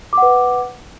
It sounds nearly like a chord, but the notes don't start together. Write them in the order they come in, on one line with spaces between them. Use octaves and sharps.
D6 F#5 B4